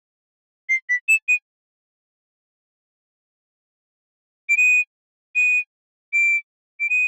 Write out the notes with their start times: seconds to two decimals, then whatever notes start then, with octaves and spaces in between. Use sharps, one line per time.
0.69 C7
0.89 B6
1.09 E7
1.29 D#7
4.49 D7
4.57 D#7
5.36 D#7
6.13 D7
6.80 D7
6.90 D#7